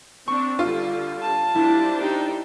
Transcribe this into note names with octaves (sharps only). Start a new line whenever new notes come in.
C4 D4 C#6
D3 G3 F4
A5
G3 D4 E4 C5
D#4 G4